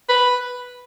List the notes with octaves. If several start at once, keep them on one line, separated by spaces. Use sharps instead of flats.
B4